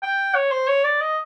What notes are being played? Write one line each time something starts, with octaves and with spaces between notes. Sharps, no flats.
G5
C#5
C5
C#5
D5
D#5